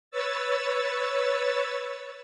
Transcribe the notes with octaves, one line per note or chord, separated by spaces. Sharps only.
B4 C#5 E6 A6